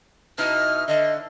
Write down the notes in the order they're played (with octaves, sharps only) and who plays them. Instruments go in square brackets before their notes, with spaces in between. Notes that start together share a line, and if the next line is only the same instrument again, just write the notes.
[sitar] B2 D#4 E4 [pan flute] F6
[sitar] D3 [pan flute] D#5